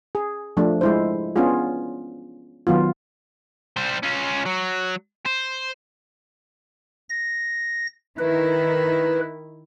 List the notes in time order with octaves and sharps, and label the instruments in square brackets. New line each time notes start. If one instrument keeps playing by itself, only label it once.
[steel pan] G#4
F3 A3 D4
G#3 E4 C5
B3 C#4 D4 F4 G#4
D#3 F#3 B3 F4
[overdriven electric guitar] G3 C5
C#4 F4
F#3
C5
[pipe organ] A#6
[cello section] D#3 E4 [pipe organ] B4